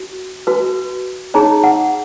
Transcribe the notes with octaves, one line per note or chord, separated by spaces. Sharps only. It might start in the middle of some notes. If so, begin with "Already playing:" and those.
Already playing: F#4
F#4 B4
D#4 G#4 C#5 A#5
F#5